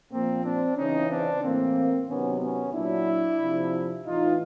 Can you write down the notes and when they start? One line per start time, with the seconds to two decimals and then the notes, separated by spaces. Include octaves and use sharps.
0.11 A#2 F3 A#3 C4
0.44 C4 D4
0.77 C#3 E3 C#4 D#4
1.09 C4 D4
1.42 A2 E3 A#3 C4
2.08 C3 D#3 F#3 B3 C#4
2.40 B3 C#4
2.73 A#2 F#3 D4 E4
3.39 C3 F3
4.05 A2 E3 D#4 F4